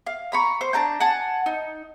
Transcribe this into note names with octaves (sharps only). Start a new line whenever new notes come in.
F5
A#5 B5 C#6
C5
D4 A5 A#5 G6
F#5 G#5 A5
D#4